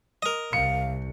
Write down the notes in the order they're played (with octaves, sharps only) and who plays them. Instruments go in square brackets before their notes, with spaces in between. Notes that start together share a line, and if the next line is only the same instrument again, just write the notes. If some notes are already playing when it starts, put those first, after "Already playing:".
[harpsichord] A#4 D#5
[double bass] C2 [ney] F5 [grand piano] C#7